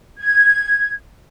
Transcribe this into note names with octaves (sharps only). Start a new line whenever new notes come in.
G#6